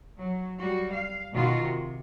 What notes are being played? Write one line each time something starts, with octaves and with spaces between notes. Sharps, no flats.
F#3
G3 F#4
F5
B2 D#3 F4 F#4
C3